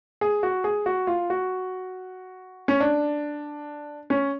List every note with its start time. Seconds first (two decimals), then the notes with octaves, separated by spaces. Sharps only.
0.21 G#4
0.43 F#4
0.64 G#4
0.86 F#4
1.07 F4
1.30 F#4
2.68 C#4
2.80 D4
4.10 C#4